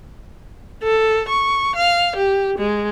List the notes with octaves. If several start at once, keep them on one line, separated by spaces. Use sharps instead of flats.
A4
C#6
F5
G4
G#3